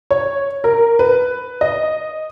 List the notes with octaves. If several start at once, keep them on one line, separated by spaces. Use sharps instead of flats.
C#5
A#4
B4
D#5